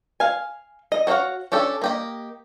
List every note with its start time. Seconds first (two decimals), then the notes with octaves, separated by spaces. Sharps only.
0.20 F5 G#5
0.92 D#5
1.07 F#4 C5 C#5 F5 F#5
1.52 C#4 D4 G4 A4
1.82 A#3 G4 D#5